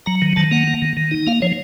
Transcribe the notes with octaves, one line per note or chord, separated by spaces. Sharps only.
F#3 A#5
D#3
D#3 A5
A#3 F#5
A#3
D#3
D#3
D#4
A#3 F5
F3 C#5